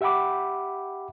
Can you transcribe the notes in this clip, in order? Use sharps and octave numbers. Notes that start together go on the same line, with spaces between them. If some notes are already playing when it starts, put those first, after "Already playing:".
G4 E5 F#5 G5 B5 D6